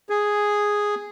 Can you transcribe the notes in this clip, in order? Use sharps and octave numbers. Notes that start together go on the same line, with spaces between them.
G#4